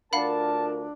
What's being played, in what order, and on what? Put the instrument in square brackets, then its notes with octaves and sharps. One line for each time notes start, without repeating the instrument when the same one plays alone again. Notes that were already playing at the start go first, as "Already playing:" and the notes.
[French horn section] D2 F4 A#4 [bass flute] D4 [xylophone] F5 F#5 B5 [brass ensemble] A5